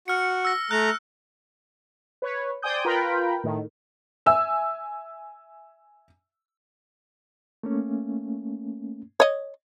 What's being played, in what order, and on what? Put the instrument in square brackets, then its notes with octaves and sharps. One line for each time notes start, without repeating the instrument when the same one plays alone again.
[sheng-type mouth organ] F#4 [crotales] F6 C#7
[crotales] E6 A#6
[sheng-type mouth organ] A3 A#5 [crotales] F#6
[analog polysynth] B4 C#5
C5 D5 G5 G#5 D#6 G6
F4 A#4 B4 G5 A#5 B5
A2 D#3
[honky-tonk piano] E5 G#5 E6
[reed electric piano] A3 A#3 C#4
[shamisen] C#5 D#5